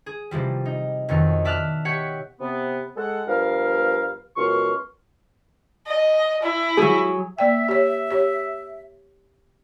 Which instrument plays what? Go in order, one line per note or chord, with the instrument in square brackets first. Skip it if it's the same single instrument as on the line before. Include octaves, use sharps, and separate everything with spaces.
[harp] G#4
C3 E3 F3 G3
D#4
F2 B2 D#3 F#3
D5 E5 A5 F6 F#6
G4 C#5 F#5 G#6 B6 C#7
[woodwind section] C3 B3
G#3 A4 F#5
G2 F3 B3 A#4 F5
C#2 F#2 B2 C6 C#6 F6
[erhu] D#5
E4
[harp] F#3 G#4
[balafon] A#3 D5 G5 [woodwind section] E5
[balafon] G4 C#5
G4 C#5